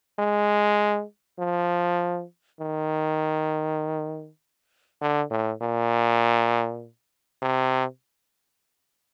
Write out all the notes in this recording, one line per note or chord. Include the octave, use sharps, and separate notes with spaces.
G#3
F3
D#3
D3
A2
A#2
C3